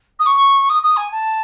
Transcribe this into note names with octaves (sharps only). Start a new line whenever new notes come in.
D#6
C#6
D#6
D#6
G#5
A5